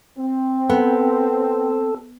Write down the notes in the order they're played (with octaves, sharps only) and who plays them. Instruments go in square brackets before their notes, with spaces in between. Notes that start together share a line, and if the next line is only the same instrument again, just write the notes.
[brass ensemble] C4
[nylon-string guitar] B3 [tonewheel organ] A4